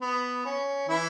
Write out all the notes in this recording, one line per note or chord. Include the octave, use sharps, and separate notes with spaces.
B3
C#4
E3 E4